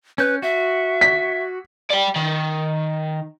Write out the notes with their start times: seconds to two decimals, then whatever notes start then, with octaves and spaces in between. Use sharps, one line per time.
0.18 C#4 B4 G6
0.42 F#4 E5
1.01 B6
1.90 D5 G5
2.16 D#3